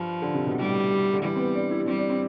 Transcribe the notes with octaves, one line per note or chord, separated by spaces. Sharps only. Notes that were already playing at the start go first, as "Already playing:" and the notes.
Already playing: G2 F3
D3
C3
B2
A2 G3
D3
E3 G3
C4
B3
D4
E4
G3 C4
D4
C4